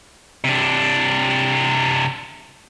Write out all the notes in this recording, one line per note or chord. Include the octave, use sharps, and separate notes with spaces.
C3 D4